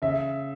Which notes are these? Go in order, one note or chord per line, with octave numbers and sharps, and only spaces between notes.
C#3 E5